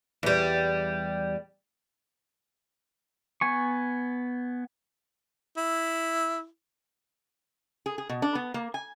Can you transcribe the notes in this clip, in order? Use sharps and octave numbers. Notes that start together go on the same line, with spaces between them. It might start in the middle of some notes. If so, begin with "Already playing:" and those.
E2 G3
B3 G#5 C#6
E4
G#4
G#4
B2
D4
B3
A#3
G#5